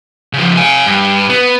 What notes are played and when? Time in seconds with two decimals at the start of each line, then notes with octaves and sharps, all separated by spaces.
0.33 C#3 F3
0.57 F5 G#5
0.86 G2
1.30 B3